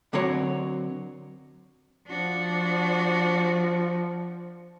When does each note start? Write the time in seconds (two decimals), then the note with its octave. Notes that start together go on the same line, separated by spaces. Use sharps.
0.13 D3 F#3 C4 A#4 C#5
2.08 F3 D4 F#4